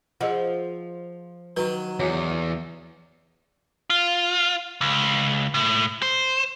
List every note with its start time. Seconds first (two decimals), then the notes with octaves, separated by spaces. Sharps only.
0.21 F3 G#4 D#5 F#5
1.57 D#3 F#3 B4
2.00 E2 F#4 C#5
3.90 F4
4.81 C#2
5.54 A2
6.02 C5